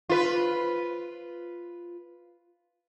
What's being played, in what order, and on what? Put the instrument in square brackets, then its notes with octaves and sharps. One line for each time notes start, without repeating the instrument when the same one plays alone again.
[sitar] F4 B4